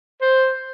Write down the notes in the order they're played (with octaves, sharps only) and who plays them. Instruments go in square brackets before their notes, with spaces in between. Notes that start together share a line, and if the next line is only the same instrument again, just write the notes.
[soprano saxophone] C5